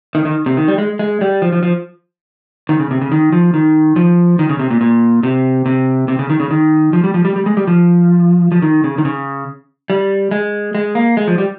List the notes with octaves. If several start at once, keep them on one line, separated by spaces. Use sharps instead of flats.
D#3
D#3
C3
D#3
G3
G#3
G#3
G3
F3
F3
F3
D#3
C#3
C3
C#3
D#3
F3
D#3
F3
D#3
C#3
C3
A#2
A#2
C3
C3
C3
C#3
D#3
C#3
D#3
F3
G3
F3
G3
G3
G#3
G3
F3
F3
D#3
C#3
D#3
C#3
G3
G#3
G#3
A#3
G#3
F3
G3